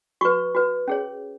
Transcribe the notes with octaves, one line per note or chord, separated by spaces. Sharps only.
F#4 B4 C#6
F#4 B4
C#4 G#4 C#5